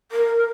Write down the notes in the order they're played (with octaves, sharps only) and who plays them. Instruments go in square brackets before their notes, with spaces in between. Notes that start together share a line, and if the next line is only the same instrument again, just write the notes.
[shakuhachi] A#4